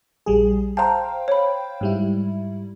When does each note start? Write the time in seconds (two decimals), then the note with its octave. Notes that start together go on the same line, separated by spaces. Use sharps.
0.26 A#1 G3 G#4
0.77 C5 F5 G5 A5 A#5
1.28 C#5 B5
1.81 G#2 G3 E4